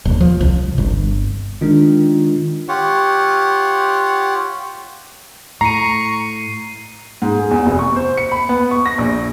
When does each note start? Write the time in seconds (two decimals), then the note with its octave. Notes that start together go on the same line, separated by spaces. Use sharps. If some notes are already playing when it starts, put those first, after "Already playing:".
0.05 D#1
0.21 F3
0.41 C2
0.78 G1
1.61 D#3 G#3 D4 F4
2.68 F4 G4 C#5 F#5
5.61 A2 A#5 C#6 C7 D#7
7.22 G#2
7.39 G#4
7.51 E2
7.66 F1
7.79 C#6
7.96 C5
8.17 C#7
8.32 B5
8.49 B3
8.71 C#6
8.86 A#6
8.98 A#1